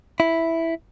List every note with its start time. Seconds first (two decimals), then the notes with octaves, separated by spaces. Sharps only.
0.20 E4